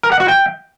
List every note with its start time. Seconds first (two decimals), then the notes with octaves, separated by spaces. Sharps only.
0.03 A#4
0.12 F#5
0.20 F#4
0.28 G5